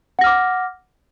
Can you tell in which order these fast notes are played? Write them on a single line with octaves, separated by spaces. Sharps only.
F#5 A#6 F6 D6